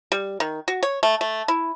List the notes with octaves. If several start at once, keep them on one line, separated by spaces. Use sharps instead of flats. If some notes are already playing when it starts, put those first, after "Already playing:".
G3
D#3
F#4
C#5
A3
A3
E4